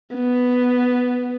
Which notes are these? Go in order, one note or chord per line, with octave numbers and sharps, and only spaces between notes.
B3